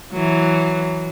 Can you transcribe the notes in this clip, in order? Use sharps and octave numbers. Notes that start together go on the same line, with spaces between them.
E3 F#3